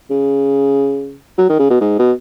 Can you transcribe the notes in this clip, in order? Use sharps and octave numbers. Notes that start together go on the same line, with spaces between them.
C#3
F#3
D#3
C#3
B2
G#2
B2